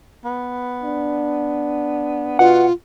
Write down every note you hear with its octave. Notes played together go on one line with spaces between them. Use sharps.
B3
D4
B2 F4 F#5